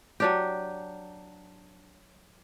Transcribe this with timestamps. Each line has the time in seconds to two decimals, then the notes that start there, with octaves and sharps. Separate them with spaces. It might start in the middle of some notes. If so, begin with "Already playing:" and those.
0.20 F#3 D4 G4